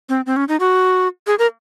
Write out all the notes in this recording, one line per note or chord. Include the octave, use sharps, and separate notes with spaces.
C4
C4
C#4
D#4
F#4
G#4
A#4